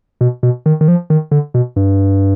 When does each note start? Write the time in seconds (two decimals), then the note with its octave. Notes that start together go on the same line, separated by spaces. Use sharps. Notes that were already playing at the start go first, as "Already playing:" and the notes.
0.21 B2
0.43 B2
0.66 D#3
0.81 D#3
0.88 F3
1.10 D#3
1.31 D3
1.54 B2
1.76 G2